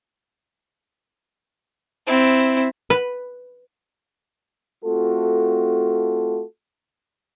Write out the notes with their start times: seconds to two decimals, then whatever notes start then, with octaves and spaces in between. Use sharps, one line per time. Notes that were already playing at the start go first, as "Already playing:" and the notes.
2.07 C4 E4
2.90 B4
4.85 A3 C4 F4 F#4 A4